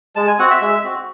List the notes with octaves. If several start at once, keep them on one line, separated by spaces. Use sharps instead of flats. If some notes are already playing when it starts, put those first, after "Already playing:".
G#3 A5
G#5
C4 F#4 F#5
E5
G#3 E5
C4 F#4